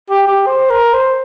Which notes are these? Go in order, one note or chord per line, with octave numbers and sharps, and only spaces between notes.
G4
G4
C5
A#4
C5